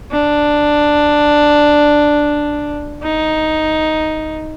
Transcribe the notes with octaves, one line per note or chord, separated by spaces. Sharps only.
D4
D#4